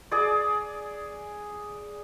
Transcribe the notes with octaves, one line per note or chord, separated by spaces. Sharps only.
G#4 D5